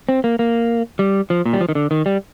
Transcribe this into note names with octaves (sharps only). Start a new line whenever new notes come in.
C4
A#3
A#3
G3
F3
A#2
G3
F3
D#3
D3
D#3
G3